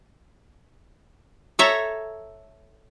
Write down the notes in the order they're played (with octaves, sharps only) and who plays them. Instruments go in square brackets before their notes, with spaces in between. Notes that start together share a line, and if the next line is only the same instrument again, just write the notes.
[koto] A4 C#5 E5 A#5